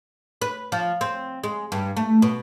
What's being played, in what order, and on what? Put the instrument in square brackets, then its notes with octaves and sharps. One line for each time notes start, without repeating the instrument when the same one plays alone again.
[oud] B4
F3
C4
G#3
G2
A3
B2